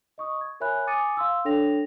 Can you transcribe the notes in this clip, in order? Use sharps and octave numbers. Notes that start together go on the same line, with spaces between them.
D#5 C#6 D#6
G#6
A#4 C#5 E5 G#5 B5 F#6
G#5 D6 D#6 A6 C#7 D#7
F5 C6 E6
D4 A4 C#5 G5 A#6 F7